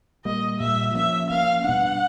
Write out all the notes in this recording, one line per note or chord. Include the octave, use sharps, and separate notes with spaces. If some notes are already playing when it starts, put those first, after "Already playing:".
A#2 G3 A#3 D#5
A#2 G3 A#3 E5
F3 A#3 C#4 E5
F3 A#3 C#4 F5
B2 G3 B3 D4 F#5